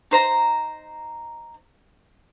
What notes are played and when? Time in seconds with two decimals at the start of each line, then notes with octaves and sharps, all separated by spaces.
0.11 D#4 C5 A#5